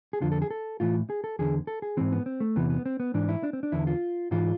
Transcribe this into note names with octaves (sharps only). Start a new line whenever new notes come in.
G#4
F2 D3 F4
A4
G#4
A4
A2 E3 F4
G#4
A4
E2 D3 G#4
A4
G#4
G#2 E3 C4
B3
C4
A3
E2 C3 E3 B3
B3
C4
B3
G#2 E3 D4
E4
D4
C4
D4
E2 D3 E4
F4
G#2 E3 F4